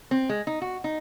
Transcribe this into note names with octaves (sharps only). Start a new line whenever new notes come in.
C4
G#3
D#4
F#4
D#4